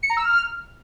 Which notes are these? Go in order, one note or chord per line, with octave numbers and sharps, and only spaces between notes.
C#7
A#5
E6
F6